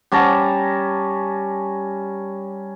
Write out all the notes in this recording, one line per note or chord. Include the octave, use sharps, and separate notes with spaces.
G3 C#4 A5 A#5